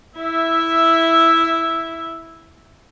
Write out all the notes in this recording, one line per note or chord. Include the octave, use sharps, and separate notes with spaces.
E4 E5